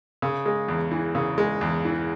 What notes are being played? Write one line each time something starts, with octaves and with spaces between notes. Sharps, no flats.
C#3
G#3
E2
E3
C#3
G#3
E2
E3